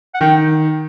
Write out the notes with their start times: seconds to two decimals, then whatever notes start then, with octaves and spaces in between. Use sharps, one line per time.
0.15 F#5
0.21 D#3 G5